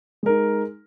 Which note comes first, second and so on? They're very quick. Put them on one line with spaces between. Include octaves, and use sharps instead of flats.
G#3 A#4 D#4